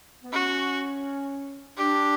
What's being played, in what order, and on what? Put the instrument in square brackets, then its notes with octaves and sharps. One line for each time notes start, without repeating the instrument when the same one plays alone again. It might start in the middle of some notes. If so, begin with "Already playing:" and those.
[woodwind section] B3
[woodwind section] C#4 [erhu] F#4
[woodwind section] D4 [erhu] G4